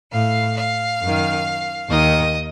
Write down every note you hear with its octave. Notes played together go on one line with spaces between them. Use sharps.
A2 F5
F5
F#2 D#3
D#2 D#3 D#5